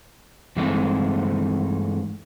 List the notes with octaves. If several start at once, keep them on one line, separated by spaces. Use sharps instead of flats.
G2 E3 G#3 A3 C4 D#4